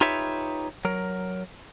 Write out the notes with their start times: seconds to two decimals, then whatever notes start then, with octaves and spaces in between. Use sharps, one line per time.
0.01 D#4 F4 G4 B4 C#5 E5
0.85 F#3 A#4